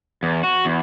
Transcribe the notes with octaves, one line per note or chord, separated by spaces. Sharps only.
E2
F#4
E2